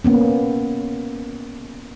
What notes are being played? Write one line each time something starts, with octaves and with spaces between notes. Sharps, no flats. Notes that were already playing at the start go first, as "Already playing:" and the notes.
A#3 B3 C#4